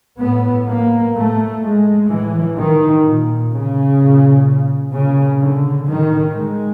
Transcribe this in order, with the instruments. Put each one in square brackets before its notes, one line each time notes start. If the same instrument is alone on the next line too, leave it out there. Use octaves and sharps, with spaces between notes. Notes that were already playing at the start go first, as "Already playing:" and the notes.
[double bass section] A2 B3
A#3
A2 A3
G#3
A2 E3
D#3
A#2
C#3
A#2
A#2 C#3
D3
A2 D#3
G#3